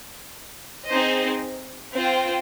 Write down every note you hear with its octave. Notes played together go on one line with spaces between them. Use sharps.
C4 D#4 G#4 C5 D#5
C4 F4 C5 G5